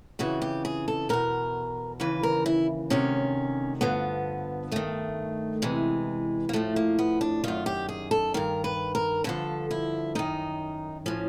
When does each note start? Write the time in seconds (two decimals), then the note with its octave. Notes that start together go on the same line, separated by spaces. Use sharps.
0.19 F2 C#3 E3 F#4
0.41 G4
0.65 G#4
0.88 A4
1.09 E2 B2 A#4
2.00 D#2 C#3 E3 B4
2.23 A#4
2.46 E4
2.90 D2 C3 D#3 C#4
3.81 G2 D3 F3 B3
4.71 G2 D#3 A3
5.62 E2 C3 E3 G#3
6.49 A#3
6.53 A2 F3 A3
6.76 A#3
6.99 B3
7.21 D4
7.44 F#2 D#3 F4
7.66 G4
7.89 G#4
8.11 A4
8.34 G2 D#3 A#4
8.64 B4
8.95 A#4
9.24 G2 D3 F3 A4
9.71 E4
10.15 F#2 D#3 D#4
11.06 A2 F3 C#4